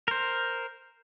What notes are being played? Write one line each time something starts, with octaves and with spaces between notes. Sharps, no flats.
A#4 C5